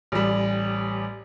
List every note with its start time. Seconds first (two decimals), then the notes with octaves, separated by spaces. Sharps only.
0.12 A1 G3